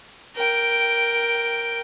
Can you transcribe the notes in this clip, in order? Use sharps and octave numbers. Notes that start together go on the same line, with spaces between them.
A#4 G5